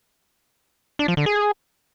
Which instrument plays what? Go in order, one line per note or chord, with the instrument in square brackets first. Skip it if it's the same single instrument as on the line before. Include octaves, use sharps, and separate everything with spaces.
[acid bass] D4
F3
D3
G#4